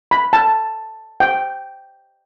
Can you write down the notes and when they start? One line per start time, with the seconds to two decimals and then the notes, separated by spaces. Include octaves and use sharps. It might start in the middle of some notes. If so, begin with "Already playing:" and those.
0.11 B5
0.33 A5
1.20 G5